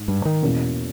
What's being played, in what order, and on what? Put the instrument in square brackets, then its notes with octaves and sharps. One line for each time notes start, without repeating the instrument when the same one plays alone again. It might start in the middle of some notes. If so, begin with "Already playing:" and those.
Already playing: [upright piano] G#2
[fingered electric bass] G2
D#3
[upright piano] E2 B2 A#3 C#4